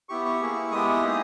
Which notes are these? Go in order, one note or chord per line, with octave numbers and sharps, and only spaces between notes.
B3 E4 G4 C#6
C#6
A#3 E4 G#4
G#3 B3 E4 G4 D#6
A#3 D#4 G#4